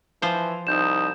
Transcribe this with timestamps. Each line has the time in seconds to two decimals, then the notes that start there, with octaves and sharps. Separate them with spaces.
0.22 E3 F3 C5
0.67 C2 D#4 G6 E7